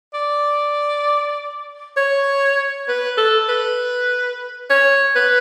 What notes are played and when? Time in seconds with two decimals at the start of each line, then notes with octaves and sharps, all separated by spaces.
0.14 D5
1.97 C#5
2.88 B4
3.18 A4
3.49 B4
4.70 C#5
5.16 B4